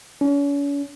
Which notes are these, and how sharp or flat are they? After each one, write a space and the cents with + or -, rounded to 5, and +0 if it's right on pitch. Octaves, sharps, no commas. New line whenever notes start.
C#4 +40